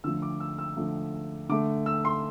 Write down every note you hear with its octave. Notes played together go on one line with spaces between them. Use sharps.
D3 F3 A3 E6
D6
E6
E6
D3 F3 A3
D3 A3 D6
E6
C6